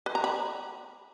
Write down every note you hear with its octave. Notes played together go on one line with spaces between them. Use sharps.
B4
A#5
B5